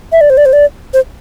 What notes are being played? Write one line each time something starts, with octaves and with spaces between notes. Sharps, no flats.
E5
D5
C5
D5
C5
D5
C5